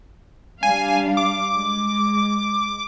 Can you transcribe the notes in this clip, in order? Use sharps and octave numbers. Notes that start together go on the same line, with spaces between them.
G3 D4 F5 G#5
D6
G#3